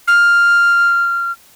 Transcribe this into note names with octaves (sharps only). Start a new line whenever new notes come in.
F6